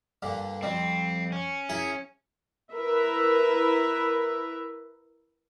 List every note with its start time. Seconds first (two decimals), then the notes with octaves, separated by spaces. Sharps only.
0.22 G2 A#2 D3
0.63 F2 G3 C4
1.32 C#4
1.69 E4 G#4 A#4
2.73 E4 A#4 B4 E5